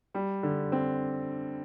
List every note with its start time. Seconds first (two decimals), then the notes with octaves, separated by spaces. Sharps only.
0.14 G3
0.43 D3
0.72 C4